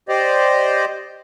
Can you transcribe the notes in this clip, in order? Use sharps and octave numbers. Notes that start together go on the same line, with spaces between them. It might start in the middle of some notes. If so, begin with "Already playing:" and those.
G4 C5 D5 D#5